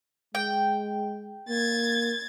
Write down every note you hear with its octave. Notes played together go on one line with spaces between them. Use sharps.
G#3 G5
A#3 G#6 A6